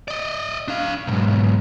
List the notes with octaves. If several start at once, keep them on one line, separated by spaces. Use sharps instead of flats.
D5 D#5
D4 F5
B1 G#2